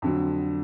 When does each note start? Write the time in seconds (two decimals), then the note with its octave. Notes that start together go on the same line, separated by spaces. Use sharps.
0.02 F2 D3 F#3